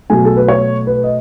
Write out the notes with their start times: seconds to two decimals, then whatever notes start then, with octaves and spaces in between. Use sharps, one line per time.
0.10 B2 F#3 A3 G#5
0.25 A4
0.36 B4
0.48 C#5
0.87 B4
1.04 D#5